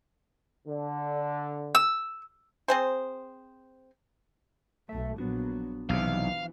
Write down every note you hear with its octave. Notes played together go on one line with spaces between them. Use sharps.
D3
E6
C4 G#4 C5
B1 A3 A4 E5
A#1 F#3 B3 D4 F#4
B1 C3 E3 F3 F5